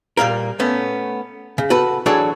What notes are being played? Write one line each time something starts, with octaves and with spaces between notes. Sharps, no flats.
A#2 G3 A#3 A#4
A3 B3 C#4
C#3
F#4 A4 B4
E3 F#3 D4 F#4 G#4 A4